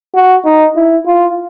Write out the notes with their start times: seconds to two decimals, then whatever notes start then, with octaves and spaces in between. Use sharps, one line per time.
0.15 F#4
0.45 D#4
0.76 E4
1.06 F4